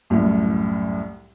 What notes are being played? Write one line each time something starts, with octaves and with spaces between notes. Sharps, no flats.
C2 F#2 A2